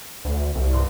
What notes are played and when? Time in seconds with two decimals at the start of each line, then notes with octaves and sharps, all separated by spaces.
0.25 D2
0.55 C2
0.73 G2 C6